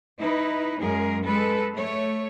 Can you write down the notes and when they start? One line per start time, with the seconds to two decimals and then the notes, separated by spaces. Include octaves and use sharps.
0.18 D#4 E4 B4
0.79 F#2 G#3 G#4 A#4
1.23 G#3 A4 B4
1.74 A3 C#5